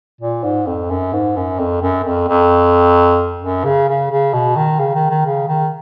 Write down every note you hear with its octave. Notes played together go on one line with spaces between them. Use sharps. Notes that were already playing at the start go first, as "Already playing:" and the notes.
A#2
G#2
F2
F#2
G#2
F#2
F2
F#2
F2
F2
F#2
C#3
C#3
C#3
B2
D#3
C#3
D#3
D#3
C#3
D#3